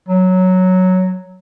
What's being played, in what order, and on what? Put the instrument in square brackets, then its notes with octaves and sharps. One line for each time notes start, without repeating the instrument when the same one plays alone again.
[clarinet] F#3